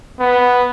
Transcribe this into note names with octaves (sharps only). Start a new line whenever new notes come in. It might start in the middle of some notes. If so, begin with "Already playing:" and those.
B3